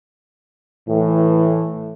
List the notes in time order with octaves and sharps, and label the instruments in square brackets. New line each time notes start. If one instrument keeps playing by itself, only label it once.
[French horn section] A2 E3